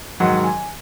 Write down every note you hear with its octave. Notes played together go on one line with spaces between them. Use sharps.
G#2 D#3 F#3 F#5
G#5